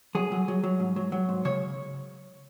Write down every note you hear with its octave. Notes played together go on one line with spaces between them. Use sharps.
F#3 G#4
F#3
F#3
F#3
G#2
F#3
F#3
G#2
C#3 C#5